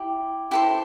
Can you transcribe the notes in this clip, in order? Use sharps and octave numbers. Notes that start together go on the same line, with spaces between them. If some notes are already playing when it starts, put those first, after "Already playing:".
Already playing: E4 G4
E4 G4 A4 C5 G5